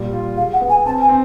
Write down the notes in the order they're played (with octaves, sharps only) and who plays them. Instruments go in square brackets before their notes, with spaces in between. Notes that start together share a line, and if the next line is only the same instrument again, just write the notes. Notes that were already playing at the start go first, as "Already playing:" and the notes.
Already playing: [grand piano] A#2 G3
F4
[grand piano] G#4 [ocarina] F5
[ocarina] F#5
[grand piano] B3
[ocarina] G#5
[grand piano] C4 [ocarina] A5
[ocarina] G#5
[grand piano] C4